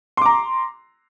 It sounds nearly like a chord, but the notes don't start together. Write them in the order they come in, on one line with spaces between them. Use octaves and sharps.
C6 D6 A#5